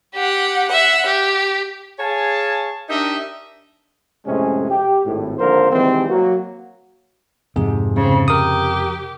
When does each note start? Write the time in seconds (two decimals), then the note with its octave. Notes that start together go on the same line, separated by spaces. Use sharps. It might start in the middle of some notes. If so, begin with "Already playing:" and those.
0.14 G4 F#5
0.68 E5 F#5
1.06 G4
1.99 G#4 C#5 F5 G#5 A5
2.89 D4 D#4 G4 A#4 D#5 E5
4.27 F2 A2 C3 G#3 A3 C#4
4.71 G4
5.05 G#1 A2
5.38 G#1 D3 F3 A#3 A#4 C5
5.72 C3 D#3 E3 G3 G#3 C4
6.09 F#3 A#3 F#4
7.56 F2 G#2 C3 G#4
7.97 C#3 C4
8.28 G4 A#4 D#6